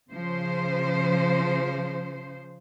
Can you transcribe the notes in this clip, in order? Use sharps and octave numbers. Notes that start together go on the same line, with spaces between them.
C#3 F3 C5